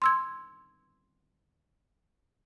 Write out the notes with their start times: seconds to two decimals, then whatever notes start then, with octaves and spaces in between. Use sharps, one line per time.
0.02 C6 E6 G#6